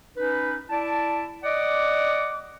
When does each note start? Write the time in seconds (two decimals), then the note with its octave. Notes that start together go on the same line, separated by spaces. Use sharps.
0.17 C#4 D#4 B4
0.69 E4 D5 A5
1.43 D5 D#5 F#5 D6